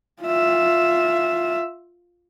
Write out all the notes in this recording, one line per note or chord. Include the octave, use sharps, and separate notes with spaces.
F4 E5